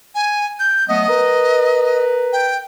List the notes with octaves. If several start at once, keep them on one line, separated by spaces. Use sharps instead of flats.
G#5
G6
F#3 A3 B3 D#5
A#4 B4
G5